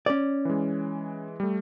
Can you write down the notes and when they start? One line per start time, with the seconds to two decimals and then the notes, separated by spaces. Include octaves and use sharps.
0.06 C#4 D5
0.45 E3 G#3
1.40 G3 A3